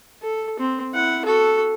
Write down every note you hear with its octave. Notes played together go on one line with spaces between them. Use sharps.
A4
C4
E4 F#5
F#4 A4